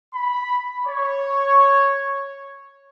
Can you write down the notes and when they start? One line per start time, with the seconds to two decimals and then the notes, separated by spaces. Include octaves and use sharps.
0.13 B5
0.86 C#5